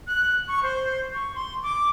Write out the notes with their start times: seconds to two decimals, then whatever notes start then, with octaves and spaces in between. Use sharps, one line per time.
0.07 F#6
0.48 C#6
0.63 C5
1.14 C#6
1.35 C6
1.63 D6